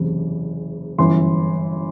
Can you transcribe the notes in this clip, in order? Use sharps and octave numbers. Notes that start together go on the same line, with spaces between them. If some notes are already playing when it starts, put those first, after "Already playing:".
Already playing: F#1 E2 C3 E3
G1 F#2 E3 C6